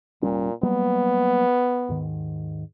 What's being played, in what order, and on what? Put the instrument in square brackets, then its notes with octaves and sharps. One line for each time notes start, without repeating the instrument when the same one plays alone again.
[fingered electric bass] F1 G3 C#4 [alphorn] A#2
[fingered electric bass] F#3 G3 A#3 [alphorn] B3
[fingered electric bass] D#2 G#2 D#3